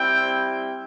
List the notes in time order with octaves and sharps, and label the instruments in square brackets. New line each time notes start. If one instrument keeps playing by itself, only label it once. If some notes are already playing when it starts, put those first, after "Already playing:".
Already playing: [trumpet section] G3 C4 E4 G5